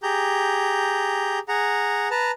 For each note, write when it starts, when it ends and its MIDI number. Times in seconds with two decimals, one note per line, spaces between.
0.03 1.39 67
0.03 1.39 68
0.03 1.39 82
0.03 1.39 91
1.48 2.08 68
1.48 2.08 78
1.48 2.08 82
2.11 2.31 71
2.11 2.31 81
2.11 2.31 82